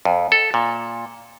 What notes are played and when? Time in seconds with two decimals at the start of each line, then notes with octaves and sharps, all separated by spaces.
0.05 F2
0.32 A4
0.54 A#2